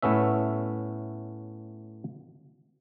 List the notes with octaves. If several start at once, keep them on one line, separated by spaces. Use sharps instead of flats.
A2 A3 B3 C#4 E5